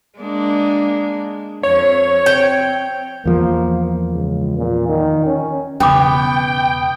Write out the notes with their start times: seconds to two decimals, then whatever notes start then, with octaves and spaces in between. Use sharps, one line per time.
0.19 G#3 A#3 D4
1.63 F2 C#5
2.26 C4 G5
3.25 E2 F3 A#3
4.12 C#2
4.57 A#2
4.88 D#3
5.26 C#4
5.80 E1 C#3 B3 C#4 G5 D6